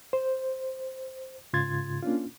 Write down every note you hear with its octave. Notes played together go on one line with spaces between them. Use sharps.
C5
G#2 C#3 F4 C6 G#6 A6
A#3 C#4 D4 F4